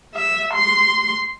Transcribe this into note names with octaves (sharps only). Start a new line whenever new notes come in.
E5
C6